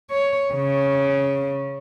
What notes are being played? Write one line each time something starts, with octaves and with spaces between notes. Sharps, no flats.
C#5
C#3